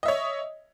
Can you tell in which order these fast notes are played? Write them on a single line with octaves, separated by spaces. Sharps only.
D#5 E5 C#5